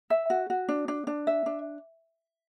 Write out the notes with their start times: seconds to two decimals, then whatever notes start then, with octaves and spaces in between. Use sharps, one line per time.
0.10 E5
0.30 F#4
0.50 F#4
0.68 D4
0.88 D4
1.07 D4
1.27 E5
1.46 D4